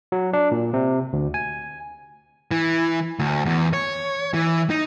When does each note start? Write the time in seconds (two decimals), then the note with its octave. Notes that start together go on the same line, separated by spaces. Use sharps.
0.12 F#3
0.33 D4
0.52 A#2
0.74 C3
1.13 D2
1.34 G#5
2.51 E3
3.19 D2
3.45 E2
3.73 C#5
4.34 E3
4.70 D#4